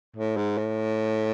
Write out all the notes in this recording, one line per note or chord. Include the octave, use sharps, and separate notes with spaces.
A2
G#2
A2